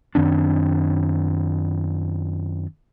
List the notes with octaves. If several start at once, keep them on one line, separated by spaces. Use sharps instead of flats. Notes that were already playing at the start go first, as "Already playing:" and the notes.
F#2 D#3 C4 D4